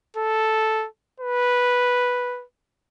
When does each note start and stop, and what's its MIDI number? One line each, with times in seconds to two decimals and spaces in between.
0.17 0.87 69
1.20 2.44 71